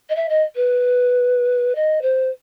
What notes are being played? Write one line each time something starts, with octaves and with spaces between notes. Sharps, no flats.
D#5
E5
D#5
B4
D#5
C5